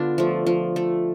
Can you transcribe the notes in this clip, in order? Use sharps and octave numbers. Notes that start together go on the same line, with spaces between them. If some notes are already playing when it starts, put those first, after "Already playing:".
Already playing: D3 B3 D4 F4
F3 A3
F3
A3